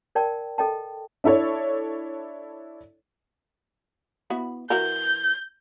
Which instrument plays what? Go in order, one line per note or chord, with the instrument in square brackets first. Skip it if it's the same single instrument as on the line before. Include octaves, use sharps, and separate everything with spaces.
[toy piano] A#4 D5 G5 A5
A4 D#5 G5 A5
[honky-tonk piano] D4 E4 A4 C#5
[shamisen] B3 E4 F#4
[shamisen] E3 F#4 A#4 [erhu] G6